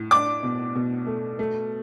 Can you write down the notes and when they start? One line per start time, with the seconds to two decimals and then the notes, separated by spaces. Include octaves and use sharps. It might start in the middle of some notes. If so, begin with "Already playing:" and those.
Already playing: A2
0.11 D4 D6
0.43 B2
0.75 B2
1.07 A3
1.39 A3